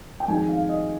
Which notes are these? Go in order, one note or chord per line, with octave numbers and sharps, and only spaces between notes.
G5
F2 D#3 G#3 G#5
F5
D#5